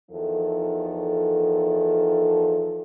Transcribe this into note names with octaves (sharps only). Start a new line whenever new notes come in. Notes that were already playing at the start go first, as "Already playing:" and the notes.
E2 D#3 F3 A4